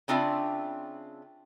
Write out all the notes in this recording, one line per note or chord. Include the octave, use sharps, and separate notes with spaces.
C#3 C4 D4 F4 E5